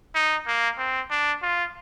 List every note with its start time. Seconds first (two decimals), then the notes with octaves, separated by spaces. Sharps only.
0.15 D#4
0.47 A#3
0.79 C4
1.11 D4
1.42 F4